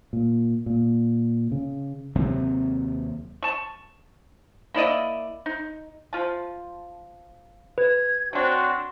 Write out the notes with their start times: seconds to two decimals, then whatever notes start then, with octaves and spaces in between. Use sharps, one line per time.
0.13 A#2
0.66 A#2
1.52 C#3
2.15 D#2 C3 F#3 C4
3.43 A5 C#6
4.74 A#3 E4 D5 D#5
5.46 D#4
6.13 F3 F4 A5
7.78 B4 G#6
8.33 F#3 C4 D4 F#4